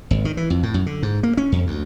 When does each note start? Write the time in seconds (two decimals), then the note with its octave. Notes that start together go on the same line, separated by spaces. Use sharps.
0.11 G#1
0.25 D#3
0.37 E3
0.50 F2
0.63 A2
0.74 F#2
0.86 D3
1.03 G#2
1.23 A#3
1.37 C#4
1.52 F2
1.67 D2